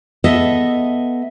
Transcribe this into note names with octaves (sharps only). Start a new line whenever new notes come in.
B3 A4 D#5 E5